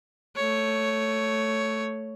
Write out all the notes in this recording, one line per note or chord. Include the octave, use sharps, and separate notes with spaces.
A3 C#5